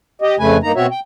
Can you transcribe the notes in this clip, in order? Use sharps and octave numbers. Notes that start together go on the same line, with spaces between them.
G4 D#5
F2 C#3 A3 B4 G#5
G2 A#3 D#4 A#5
B2 C4 F#4 C#5 E5
G5